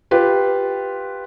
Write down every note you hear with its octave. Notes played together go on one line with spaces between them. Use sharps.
F4 G4 B4